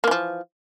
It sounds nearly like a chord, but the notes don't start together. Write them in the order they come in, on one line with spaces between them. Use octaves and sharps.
A#3 E3 F3